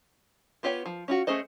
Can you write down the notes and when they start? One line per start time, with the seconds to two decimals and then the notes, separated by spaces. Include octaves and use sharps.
0.63 B3 F4 G4 C#5 G5
0.86 F3
1.08 C#4 F4 F#4
1.27 A3 C#4 G#4 C5 D#5